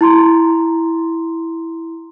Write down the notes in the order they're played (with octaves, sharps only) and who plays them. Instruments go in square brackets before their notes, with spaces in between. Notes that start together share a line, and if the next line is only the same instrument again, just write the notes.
[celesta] E4 A#5 C6